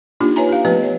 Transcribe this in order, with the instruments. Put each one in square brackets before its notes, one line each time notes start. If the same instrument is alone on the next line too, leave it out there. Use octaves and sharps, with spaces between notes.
[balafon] A#3 D4 D#4 F4 G4
B4 C#5 E5 G#5 A#5
G4 F5
F3 A3 B3 G4 B4
C#5